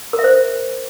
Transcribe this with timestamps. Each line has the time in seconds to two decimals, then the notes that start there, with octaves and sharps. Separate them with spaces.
0.13 A#4
0.19 E5
0.24 C5